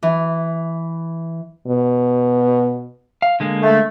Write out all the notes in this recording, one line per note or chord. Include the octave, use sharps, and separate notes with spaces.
E3
B2
F5
D3 G#3 A#3
A3